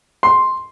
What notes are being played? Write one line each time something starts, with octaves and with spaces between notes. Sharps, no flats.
C6